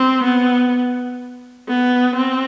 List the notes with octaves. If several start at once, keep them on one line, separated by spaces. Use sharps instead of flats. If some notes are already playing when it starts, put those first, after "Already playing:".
Already playing: C4
B3
B3
C4